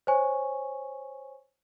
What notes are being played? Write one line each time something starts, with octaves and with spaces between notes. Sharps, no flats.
C5 C#5 G#5 C#6